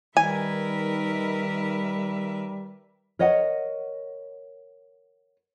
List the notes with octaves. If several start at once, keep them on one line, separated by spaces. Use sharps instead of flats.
D#3 G3 A#4 B4 E5 G#5
A#4 C#5 D#5 F#5